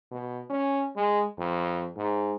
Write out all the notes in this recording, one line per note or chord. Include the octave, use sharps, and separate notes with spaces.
B2
C#4
G#3
F2
G#2